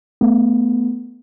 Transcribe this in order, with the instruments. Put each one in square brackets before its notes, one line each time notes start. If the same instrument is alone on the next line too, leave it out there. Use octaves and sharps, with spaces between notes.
[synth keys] A3 B3